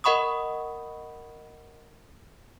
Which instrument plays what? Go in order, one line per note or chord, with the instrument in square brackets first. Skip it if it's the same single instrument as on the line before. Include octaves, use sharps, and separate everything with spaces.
[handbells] A#4 D#5 F#5 B5 C#6 D#6